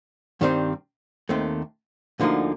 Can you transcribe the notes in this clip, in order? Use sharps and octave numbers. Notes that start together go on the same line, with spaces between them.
G2 D#3 G3 C4
D#2 D#3 A3 C4
D2 D3 F3 A#3 D#4